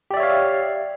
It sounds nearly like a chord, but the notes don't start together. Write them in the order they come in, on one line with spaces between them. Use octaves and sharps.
G4 D5 E5 C#5 F5